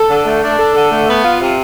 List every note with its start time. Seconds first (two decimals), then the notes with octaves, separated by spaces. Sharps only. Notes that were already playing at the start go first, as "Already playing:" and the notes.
Already playing: A4
0.09 D3
0.26 A3
0.42 D4
0.59 A4
0.75 D3
0.91 A3
1.07 B3
1.24 F4
1.40 C3